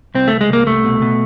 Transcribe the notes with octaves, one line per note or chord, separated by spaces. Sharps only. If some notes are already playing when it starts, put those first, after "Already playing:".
C2 C4
C2 A3
G#3
C2 A#3
C2 A3
B2
B2